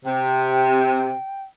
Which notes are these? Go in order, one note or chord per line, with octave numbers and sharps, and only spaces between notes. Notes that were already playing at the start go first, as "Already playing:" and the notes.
C3 G5